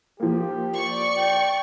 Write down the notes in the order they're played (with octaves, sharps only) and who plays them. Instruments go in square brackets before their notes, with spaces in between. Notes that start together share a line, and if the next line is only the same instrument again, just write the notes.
[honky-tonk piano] F3 A#3 [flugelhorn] G4
[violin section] D5 C#6
[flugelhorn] G5